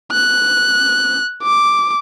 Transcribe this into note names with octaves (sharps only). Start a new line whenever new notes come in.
F#6
D6